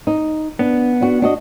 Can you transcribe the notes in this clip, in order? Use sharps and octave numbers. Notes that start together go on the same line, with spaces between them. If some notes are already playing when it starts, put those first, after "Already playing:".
D#4
B3 D4
D4 F#4
D4 F#4 D#5